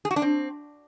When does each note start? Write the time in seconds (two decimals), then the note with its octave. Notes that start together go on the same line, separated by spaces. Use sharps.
0.05 G#4
0.11 F#4
0.16 D4
0.22 C4